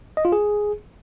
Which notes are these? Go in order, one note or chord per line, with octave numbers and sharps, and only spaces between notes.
D#5
F4
G#4